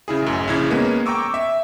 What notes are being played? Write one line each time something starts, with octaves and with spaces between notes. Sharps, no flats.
C#3 E4 G#4
A1 F#2
A#1 C#3 E4 G#6
G#3 A#3 B3 C#4
G5 A#5 C#6 D6 E6
E5